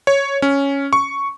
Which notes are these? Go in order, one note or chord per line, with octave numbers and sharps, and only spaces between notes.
C#5
C#4
C#6